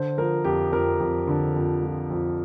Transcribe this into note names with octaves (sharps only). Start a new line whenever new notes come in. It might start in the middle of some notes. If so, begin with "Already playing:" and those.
Already playing: D3 C5
F3 A#4
F2 G4
F2 A#4
F2
D3
F2
F3
F2